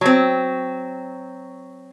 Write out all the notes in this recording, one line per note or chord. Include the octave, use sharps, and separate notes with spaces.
F#3 C4